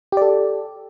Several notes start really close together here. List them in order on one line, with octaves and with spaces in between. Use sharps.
G4 D5 A4